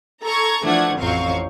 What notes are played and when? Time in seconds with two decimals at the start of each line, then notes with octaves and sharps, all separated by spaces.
0.23 A4 A#5 C#6 G#6
0.65 E3 F3 A3 D4 F#5 G#6
0.98 A1 F2 F#3 C4 F5 C#6